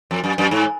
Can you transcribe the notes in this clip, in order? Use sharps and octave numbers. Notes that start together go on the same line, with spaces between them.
F2
F#2
F#2
G#2